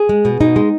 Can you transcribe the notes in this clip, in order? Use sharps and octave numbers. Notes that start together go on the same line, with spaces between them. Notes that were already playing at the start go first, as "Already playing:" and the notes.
Already playing: G#4
G#3
B2
B2 D#4
G#3